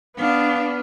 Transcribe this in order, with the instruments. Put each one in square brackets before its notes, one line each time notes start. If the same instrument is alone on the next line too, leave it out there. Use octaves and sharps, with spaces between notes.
[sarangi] B3 [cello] D4 [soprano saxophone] F5